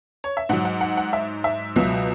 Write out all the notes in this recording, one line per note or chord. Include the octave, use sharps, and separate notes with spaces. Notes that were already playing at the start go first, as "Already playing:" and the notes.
C#5
E5
G#2 F#3 F#5
F#5
F#5
F#5
E5
E5
C#2 B2 F#3